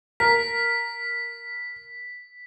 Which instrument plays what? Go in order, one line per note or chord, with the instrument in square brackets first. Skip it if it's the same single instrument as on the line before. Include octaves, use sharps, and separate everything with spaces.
[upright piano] A#4 [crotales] B6